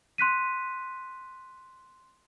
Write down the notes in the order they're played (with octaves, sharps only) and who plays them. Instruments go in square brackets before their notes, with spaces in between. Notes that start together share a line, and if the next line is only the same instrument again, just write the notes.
[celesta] C6 F#6 B6 D#7